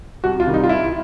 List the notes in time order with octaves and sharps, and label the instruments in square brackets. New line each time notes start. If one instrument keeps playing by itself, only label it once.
[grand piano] C2 F#4
F4
C3 D#3 G3
D#4
F4
C2 E4